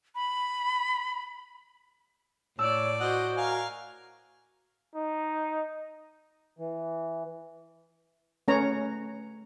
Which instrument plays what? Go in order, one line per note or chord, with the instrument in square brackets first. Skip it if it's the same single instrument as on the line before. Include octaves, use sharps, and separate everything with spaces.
[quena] B5
[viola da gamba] A2 D5 [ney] C#5 [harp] G5 A5 E6
[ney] F#4 [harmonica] C5 D#5 F#5
[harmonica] A#4 F5 G#5
[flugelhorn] D#4
[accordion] E3
[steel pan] A3 C#4 B4 C#5 A#5